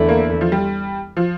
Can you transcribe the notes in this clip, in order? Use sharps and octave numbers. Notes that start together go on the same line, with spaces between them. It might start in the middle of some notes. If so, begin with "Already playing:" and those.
Already playing: E2 D3 A3 E4
A#3
F3
G3
F3